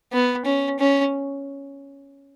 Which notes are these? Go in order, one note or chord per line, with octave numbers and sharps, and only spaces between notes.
B3
C#4
C#4